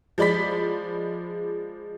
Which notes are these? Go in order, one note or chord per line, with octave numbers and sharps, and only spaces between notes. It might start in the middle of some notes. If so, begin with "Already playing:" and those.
F3 G#3 D5 B5 B6